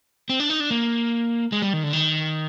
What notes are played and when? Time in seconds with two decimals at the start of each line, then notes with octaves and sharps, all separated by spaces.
0.29 C4
0.40 D4
0.50 D#4
0.60 D4
0.71 A#3
1.52 G#3
1.62 G3
1.73 D#3
1.83 D3
1.93 D#3